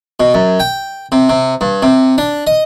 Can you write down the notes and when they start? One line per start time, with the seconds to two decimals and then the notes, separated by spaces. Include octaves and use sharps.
0.20 B2
0.34 F#2
0.60 G5
1.12 C3
1.29 C3
1.61 G2
1.82 C3
2.18 D4
2.47 D#5